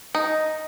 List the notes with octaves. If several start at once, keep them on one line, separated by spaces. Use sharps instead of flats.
D#4